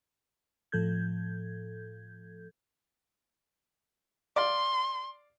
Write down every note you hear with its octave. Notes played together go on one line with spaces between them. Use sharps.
A2 F3 A4 G6 G#6
D5 F5 C6